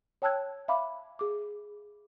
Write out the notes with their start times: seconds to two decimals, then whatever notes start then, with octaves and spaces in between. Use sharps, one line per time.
0.22 C#5 G5 A5 E6 F#6 G#6
0.68 E5 F5 B5 D6
1.19 G#4 D6